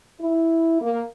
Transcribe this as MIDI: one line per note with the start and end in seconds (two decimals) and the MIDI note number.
0.21 0.79 64
0.82 1.02 58